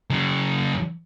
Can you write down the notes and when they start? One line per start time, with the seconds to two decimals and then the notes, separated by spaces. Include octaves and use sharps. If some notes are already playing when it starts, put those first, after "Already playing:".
0.10 C#3 F#3